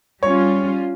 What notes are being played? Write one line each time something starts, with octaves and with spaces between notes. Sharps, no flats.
G3 C#4 F4 C#5